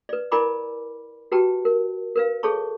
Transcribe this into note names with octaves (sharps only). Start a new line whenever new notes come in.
B4 D5
E4 A#4 D5 G#5 B5 D6
F#4 G4 B4 G5 A5
A#4
A#4 B4 F5
G#4 A4 C#5 A5 C#6